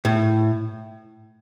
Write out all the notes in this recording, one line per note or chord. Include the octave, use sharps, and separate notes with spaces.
A2